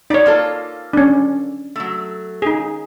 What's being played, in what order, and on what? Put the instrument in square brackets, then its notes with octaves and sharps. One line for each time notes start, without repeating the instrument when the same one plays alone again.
[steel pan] D#4 C#5 [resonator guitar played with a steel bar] D5
[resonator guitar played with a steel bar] A#3 F4 A4
[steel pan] C#4 D4
[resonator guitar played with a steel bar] F#3 A3
[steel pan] D#4 G#4